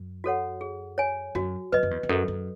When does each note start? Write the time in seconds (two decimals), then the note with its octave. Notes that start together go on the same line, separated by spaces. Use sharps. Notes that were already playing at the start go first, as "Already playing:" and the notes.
Already playing: F#2
0.24 F#4 A4 C#5 F#5
0.61 G#4
0.98 C#5 G#5
1.35 F#2 F#4
1.72 F#2 B4 D#5
1.83 F#2
1.91 E2
2.03 E2
2.09 F#2 A4
2.28 F#2